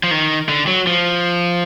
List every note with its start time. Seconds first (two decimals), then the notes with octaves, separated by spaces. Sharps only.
0.03 F3
0.11 D#3
0.49 D3
0.67 F#3
0.87 F3